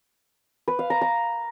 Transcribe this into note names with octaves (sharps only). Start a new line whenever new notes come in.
B4
F5
A#5
A#5